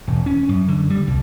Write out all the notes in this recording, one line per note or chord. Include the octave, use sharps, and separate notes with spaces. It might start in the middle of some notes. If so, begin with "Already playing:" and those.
E1
C#4
F#2
D3
G3
C2